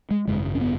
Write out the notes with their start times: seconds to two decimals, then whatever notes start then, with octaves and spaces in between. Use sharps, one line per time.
0.11 G#3
0.27 G#1 F#2 C#3 G#3
0.55 C#4
0.61 B3